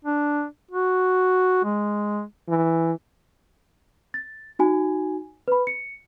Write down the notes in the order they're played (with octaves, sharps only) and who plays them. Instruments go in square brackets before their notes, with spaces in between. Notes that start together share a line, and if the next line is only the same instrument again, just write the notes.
[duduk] D4
F#4
G#3
[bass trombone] E3
[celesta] A6
D#4 F#4 G#5
B4 B5
C#7